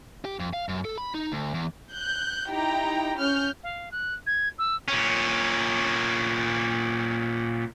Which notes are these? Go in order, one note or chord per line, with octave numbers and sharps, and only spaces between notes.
G4
F2
F5
F#2
A4
B5
D#4
D2
E2
F#6 G6
D#4 E4 G4 G5 A#5
C#4 F6 G6
F5
F#6
G#6
E6
A#2 C#4